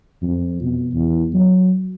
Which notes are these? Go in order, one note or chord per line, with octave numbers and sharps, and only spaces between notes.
F2
B2
E2
F#3